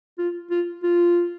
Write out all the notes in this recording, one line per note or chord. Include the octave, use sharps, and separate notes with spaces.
F4
F4
F4